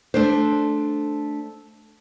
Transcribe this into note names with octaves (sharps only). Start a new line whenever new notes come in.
A3 D4 C5